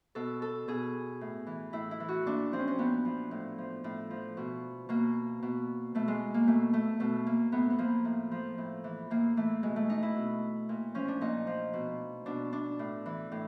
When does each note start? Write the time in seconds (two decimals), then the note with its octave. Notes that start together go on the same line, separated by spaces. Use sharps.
0.15 B2 A4
0.42 A4
0.68 B2 G#4
1.21 A2
1.47 E3
1.73 A2 E4
1.91 E4
2.00 E3
2.08 F#4
2.26 A#2 D4
2.52 F3 C4
2.60 C#4
2.68 C4
2.78 A#2 B3
3.05 F3
3.31 A2
3.58 F3
3.84 A2
4.10 F3
4.37 B2
4.89 B2 A#3
5.43 B2
5.95 B2 A3
6.08 G#3
6.34 A#3
6.47 B2 A3
6.73 A3
7.00 B2 A3
7.27 A#3
7.52 A2 B3
7.70 B3
7.78 F3 A#3
8.05 A2
8.31 F3
8.58 A2
8.84 E3
9.10 A2 A#3
9.37 E3 A3
9.63 B2 G#3
9.76 A3
9.90 D#4
10.03 E4
10.16 B2
10.69 A#2
10.95 F3 C#4
11.08 D4
11.21 A#2 D#4
11.47 F3
11.73 B2
12.26 B2 D4
12.53 D4
12.79 A2
13.06 E3
13.32 A2